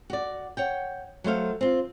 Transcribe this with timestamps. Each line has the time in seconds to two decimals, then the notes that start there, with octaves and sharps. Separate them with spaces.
0.10 F#4 D5
0.57 C#5 F#5 G5
1.24 F#3 A3 C5 F5
1.61 C4 F4